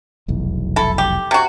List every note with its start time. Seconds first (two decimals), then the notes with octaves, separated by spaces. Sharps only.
0.28 F1 B1 E2
0.76 E4 A4
0.98 G4
1.31 C3 F#4